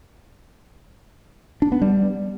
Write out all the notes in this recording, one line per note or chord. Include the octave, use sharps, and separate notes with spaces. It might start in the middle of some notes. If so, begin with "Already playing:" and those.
D4
B3
G3